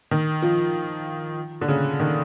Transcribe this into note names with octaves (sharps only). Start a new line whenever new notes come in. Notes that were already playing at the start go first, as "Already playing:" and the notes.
D#3
F3
D3
C#3
D#3